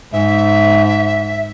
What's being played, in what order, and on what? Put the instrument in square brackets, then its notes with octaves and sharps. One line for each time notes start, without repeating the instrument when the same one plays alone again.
[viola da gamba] G#2 [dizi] E5